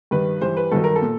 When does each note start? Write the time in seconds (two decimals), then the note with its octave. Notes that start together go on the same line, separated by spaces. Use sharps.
0.11 G2 D#3 G3 B4
0.41 G2 E3 G3 C5
0.57 B4
0.71 G2 D#3 F#3 A4
0.84 A#4
0.96 A4
1.02 A#2